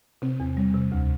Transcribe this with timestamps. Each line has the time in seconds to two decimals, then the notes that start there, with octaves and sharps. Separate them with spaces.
0.22 C3 C4
0.40 E2
0.57 G3
0.74 C3
0.92 D2